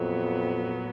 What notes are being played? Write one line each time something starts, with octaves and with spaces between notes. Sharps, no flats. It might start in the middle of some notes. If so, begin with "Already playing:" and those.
Already playing: F2 A#2 F#3 B3